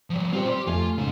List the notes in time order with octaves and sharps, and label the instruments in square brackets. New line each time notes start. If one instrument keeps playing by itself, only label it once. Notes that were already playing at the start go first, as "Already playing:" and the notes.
[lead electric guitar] F3 G3
[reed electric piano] C4 G4 C5 [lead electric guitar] F4 D5
[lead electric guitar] G4 [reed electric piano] C6
[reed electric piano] F2 A3 G#5 [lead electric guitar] F4
[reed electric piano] C#3 [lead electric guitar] G#3 D#4